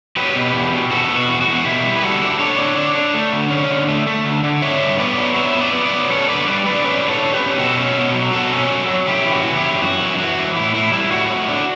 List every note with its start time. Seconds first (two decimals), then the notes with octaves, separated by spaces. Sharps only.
0.16 F#3 G4 B4
0.35 B2
0.54 E2
0.73 B2
0.91 E2 F#4 A4
1.09 B2
1.16 F#4
1.28 E2
1.41 F#4
1.47 E2
1.65 B2 E4 G4
1.84 G3
1.96 B4
2.02 G3 F#4 A4
2.21 D4
2.39 D4 A4 C#5
2.58 D4
2.76 D4
2.95 D4
3.14 A3
3.33 D3
3.51 C#4
3.70 D3
3.88 A3
4.07 A3
4.25 D3
4.44 D3
4.62 D4 C#5 E5
4.81 G2
4.99 B3 B4 D5
5.18 F#3
5.36 B3 C#5 E5
5.55 B3
5.61 B4 D5
5.73 B3
5.85 B4 D5
5.92 F#3
6.11 C#4 A4 C#5
6.29 D3 B4 D5
6.47 G3 B4 D5
6.66 D3 B4 D5
6.84 C#4 B4 D5
7.04 D3
7.09 A4 C#5
7.22 D3
7.34 G4 B4
7.40 C#4
7.59 B2 F#4 A4
7.77 C#4
7.97 B2
8.14 F#3
8.33 B2 F#4 A4
8.52 C#4
8.70 F#3
8.89 F#3
9.07 C#3 E4 G4
9.26 E3
9.32 F#4
9.45 E3
9.57 E4 G4
9.63 F#2
9.82 F#2 F#4
10.00 E3
10.18 E3 F#4
10.37 E3
10.56 A2 E4
10.74 A2 E4
10.92 G3 E4
11.11 A2 F#4
11.31 A2
11.49 D4